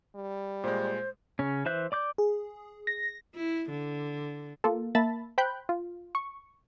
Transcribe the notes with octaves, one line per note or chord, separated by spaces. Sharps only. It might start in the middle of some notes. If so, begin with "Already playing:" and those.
G3
A#2 G#3 C5
C#3 C#4
E3 C5 E5 F#6 G6
D5 D6 G6
G#4
A#6
E4
D3
A#3 F4 A4
A#3 E5 A5 B5 A6
C5 G5 B5 F#6 G6
F4
C#6